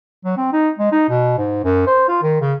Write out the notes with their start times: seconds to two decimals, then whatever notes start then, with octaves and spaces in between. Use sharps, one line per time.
0.25 F#3
0.37 C4
0.53 D#4
0.79 G#3
0.92 D#4
1.09 B2
1.38 G#2
1.64 F#2
1.87 C5
2.09 F4
2.23 D#3
2.41 C#3